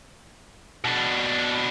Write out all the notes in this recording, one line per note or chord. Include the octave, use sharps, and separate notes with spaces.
B2 D4